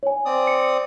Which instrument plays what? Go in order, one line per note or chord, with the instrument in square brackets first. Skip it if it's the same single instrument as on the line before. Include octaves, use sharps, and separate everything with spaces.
[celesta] C#5 G#5
[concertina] C4 D5 D#6
[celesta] C#7